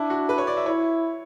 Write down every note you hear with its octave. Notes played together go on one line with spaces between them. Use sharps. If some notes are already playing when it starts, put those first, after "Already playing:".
Already playing: D4 E4
F#4
B4
C#5
D5
E5
E4 C#5